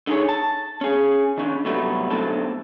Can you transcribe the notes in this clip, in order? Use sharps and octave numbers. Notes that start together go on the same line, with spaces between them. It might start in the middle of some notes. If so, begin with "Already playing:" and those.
D3 D#4 G#4 C#5
A5
C#4 G#4
D#3 C#4 D4
A2 C3 F#3 G3 A3 B3
B1 D3 A3 C4 A5